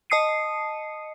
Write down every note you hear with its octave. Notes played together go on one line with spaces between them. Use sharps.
D#5 A5 D#6 C7 C#7 D#7